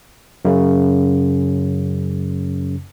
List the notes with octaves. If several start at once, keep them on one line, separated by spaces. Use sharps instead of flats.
F#2 C#3